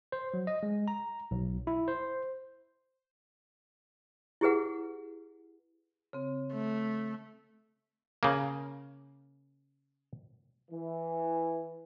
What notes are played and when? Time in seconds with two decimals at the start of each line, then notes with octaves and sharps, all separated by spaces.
0.12 C5
0.34 F#3
0.47 D#5
0.63 G#3
0.88 A#5
1.31 B1
1.67 E4
1.88 C5
4.41 E4 G4 G#4 B4 F#5
6.13 C#3 C4
6.52 A3
8.23 C#3 A#3
10.71 E3